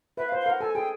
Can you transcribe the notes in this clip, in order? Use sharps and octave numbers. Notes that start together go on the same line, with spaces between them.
B4 E5
F5
C5
F5
A#4 F#5
A4 G#5
G#4 G5